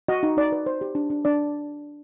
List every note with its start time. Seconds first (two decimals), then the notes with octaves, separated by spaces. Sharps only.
0.08 F#4 D#5
0.23 D#4
0.37 D#4 D5
0.52 B4
0.66 C5
0.81 G4
0.95 D4
1.10 D4
1.25 D4 D5